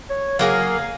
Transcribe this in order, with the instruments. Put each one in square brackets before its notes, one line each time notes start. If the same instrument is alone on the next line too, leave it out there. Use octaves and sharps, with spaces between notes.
[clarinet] C#5
[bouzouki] F#3 A#3 G#4 [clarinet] F5